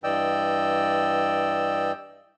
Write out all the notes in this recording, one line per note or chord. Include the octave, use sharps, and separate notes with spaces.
G2 E3 D5 D#5 G5 E6